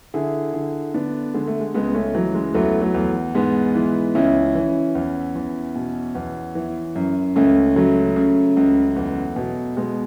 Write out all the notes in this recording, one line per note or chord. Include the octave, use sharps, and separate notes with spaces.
D3 E4 G#4
D3
D3 B3 D4
D3 G#3
A3
G#3
C#2 G#3 B3
B3
A3 C#4
E3 F#3
G#3
E2 F#3 A3
F#3 A3
E2
G#2 G#3 B3
E3
C#2 C#4 E4
E3
E2
E2
B2
E2
E3
F#2
C#2 A3 C#4
C#3 F#3 A3
C#3
C#2
E2
B2
B2 G#3